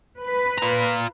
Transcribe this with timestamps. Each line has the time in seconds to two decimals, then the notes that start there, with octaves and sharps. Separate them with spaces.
0.21 B4
0.58 F4 A#5